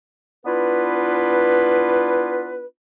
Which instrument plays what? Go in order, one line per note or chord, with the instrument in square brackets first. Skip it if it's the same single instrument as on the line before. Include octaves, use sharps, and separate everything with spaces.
[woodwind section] B3 D4 E4 F4 B4